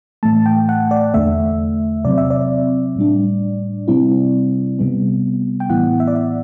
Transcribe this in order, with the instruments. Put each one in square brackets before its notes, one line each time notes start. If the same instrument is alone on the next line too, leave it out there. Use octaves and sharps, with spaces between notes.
[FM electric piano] A2 E3 A3 A5
G5
F#5
D5
E2 D3 A3 E5
C3 F#3 C4 D5
E5
D5
A2 G3 D4
C3 G3 C4 E4
C3 G3 B3
G5
A2 E3 B3 E4 F#5
E5
D5
E5